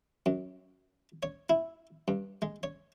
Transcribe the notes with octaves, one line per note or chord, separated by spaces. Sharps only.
F#2
C#5
E4
G2
G#3
C#5